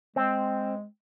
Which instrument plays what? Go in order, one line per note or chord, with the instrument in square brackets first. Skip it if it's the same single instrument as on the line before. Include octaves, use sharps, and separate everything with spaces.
[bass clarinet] G#3 [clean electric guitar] C4